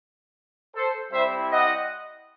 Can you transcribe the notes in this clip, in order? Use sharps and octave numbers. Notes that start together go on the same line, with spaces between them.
A4 C5
G3 C4 E4 C5 E5
D#5 F#5